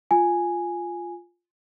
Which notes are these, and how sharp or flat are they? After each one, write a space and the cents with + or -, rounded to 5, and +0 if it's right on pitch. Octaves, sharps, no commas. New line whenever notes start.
F4 +0 G#5 +0